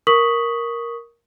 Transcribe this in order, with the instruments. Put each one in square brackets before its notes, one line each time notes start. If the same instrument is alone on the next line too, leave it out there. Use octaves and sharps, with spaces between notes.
[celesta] A#4 C#6 D#6 B6 F#7